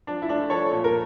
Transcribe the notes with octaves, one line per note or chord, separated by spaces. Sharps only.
F3 D4
E4
A3 D4
F3 A4 C#5
A#2
A#4